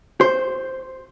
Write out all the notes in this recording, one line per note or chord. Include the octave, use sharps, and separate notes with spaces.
C5